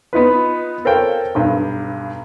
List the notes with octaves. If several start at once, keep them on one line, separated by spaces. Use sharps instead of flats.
B3 D#4 F4 B4
A4 A#4 C5 C#5 F5 G5
B1 G2